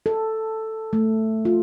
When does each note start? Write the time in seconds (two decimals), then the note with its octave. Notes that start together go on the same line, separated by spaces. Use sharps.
0.06 A4
0.93 A3
1.45 F4